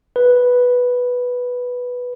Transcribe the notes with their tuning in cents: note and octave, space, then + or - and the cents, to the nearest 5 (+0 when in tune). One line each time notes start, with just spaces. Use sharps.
B4 -5